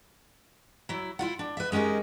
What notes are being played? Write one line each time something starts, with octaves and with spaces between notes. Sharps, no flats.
F#3 E4
E4 F4 F#5
D4
B4 E5
G#3 C#4 D#4 G4 A#4